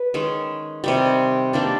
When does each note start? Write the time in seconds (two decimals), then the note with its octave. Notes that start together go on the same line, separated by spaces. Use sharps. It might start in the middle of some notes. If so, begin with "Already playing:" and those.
Already playing: B4
0.14 D#3 G#3 C#4
0.84 C3 D#3 G3
1.53 D#3 G3 A#3 D4